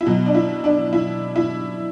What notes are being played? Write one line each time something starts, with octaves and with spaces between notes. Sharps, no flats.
E4
B2 F#3 F#4
D4
E4
D4
E4
E4